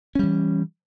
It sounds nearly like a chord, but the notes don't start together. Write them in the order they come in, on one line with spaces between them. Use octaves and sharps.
C#4 G3 E3